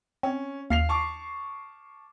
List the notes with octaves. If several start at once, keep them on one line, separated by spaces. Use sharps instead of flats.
C4 C#4
D#2 F5 C7 F7
A5 C#6 D6